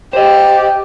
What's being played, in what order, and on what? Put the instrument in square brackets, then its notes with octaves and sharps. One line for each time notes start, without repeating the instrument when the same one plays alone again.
[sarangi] G4 [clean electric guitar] C5 D#5